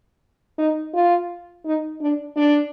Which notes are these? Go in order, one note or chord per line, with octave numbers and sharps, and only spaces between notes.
D#4
F4
D#4
D4
D4